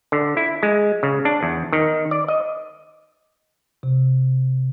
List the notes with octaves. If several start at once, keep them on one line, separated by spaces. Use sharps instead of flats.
D3
E4
G#3
C#3
D4
E2
D#3
D5
D#5
C3